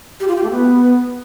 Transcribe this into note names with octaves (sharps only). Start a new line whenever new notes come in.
G4
F4
G4
A3
B3